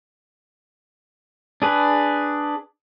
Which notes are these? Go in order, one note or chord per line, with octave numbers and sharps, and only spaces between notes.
D4 G#4 B4